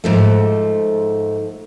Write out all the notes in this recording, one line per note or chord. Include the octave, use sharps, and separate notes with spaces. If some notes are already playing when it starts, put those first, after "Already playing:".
G#2 F3 A3